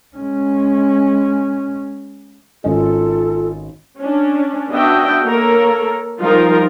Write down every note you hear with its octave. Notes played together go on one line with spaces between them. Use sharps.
G#3 C#4
G#1 C#4 F4 A4 D#5
C#4 D4
B3 D4 F#4 D#5 E5 G5
A#3 A4 A#4 C#5
F3 G3 D#4 F4 A#4